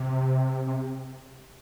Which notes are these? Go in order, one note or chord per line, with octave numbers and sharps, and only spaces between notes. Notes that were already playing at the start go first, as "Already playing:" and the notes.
Already playing: C3
C3